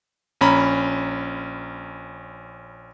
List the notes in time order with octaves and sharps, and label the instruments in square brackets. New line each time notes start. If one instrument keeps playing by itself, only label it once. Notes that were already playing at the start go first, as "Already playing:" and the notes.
[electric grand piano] A#1 C#4 A#5 B5